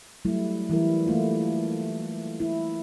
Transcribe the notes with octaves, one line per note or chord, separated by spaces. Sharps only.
F#3 G3 A3 E4
E3 G3 E4 A#4
A3 A#3 E4 F4
E4